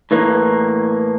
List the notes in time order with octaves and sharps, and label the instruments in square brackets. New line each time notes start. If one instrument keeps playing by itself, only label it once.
[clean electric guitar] A2 E3 A#3